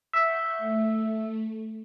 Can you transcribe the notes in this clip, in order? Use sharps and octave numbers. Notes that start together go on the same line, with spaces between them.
E5 F#5 C#6 G6
A3